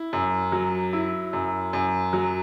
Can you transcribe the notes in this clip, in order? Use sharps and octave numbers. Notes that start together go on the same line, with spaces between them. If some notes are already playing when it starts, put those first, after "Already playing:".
Already playing: E4
F#2
F#3
E4
F#2
F#2
F#3